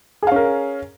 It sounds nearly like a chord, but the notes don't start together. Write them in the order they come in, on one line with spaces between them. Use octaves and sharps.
G#4 F5 C#4 A#4